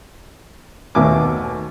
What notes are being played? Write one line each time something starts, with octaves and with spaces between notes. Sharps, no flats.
D#2 B2 A3 G#5 D6